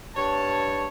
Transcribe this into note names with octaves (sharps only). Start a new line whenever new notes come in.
G2 C#5 A5